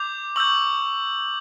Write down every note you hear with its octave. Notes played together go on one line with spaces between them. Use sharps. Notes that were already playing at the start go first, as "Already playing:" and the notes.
Already playing: D6 G6 F7
C#6 E6 G6 F#7